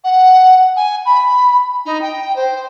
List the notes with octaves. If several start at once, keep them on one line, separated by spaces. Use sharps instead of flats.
F#5
G#5
B5
D#4
G5
C5